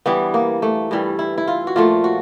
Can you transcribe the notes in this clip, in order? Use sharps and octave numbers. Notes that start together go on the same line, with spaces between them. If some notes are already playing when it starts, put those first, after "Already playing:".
G2 E3 G3 B3
A#3
A3
G2 E3 G3
E4
E4
F4
F#4
A#2 F3 A3 F4
F#4